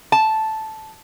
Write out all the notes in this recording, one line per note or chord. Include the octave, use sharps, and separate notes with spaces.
A5